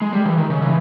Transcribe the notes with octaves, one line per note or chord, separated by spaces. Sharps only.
G#3
G3
E3
D#3
C#3
E3